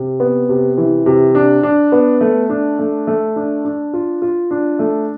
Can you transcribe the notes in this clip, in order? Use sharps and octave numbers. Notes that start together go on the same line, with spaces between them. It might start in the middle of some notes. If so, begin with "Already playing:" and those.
Already playing: C3
B3
C3
E3
C3
D4
D4
B3
A3
D4
A3
A3
D4
D4
F4
F4
D4
A3